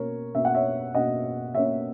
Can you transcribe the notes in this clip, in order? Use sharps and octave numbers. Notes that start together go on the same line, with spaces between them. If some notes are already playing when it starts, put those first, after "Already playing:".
Already playing: B2 A#3 C#4 A#4 C#5
B2 A#3 C#4 E5
F#5
C#5 E5
B2 A#3 C#4 D#5 F#5
B2 A#3 C#4 C#5 E5